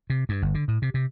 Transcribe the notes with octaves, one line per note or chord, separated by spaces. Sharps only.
C3
G2
G1
D3
A2
C3
C3